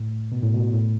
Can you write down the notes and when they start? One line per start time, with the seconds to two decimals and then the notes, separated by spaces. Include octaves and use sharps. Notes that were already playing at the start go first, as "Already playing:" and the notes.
Already playing: A2
0.32 B2
0.43 A2
0.54 B2
0.73 A2